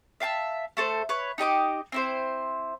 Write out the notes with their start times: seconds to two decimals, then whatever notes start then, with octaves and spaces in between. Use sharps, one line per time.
0.20 E5 F5 G5 A5
0.77 A3 A4 C5
1.09 B4 C#5
1.38 D#4 G4 D#5 D6
1.92 C4 E4 C5